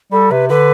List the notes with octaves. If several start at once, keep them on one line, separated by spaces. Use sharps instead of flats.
G3 A4
C3 B4
D3 B4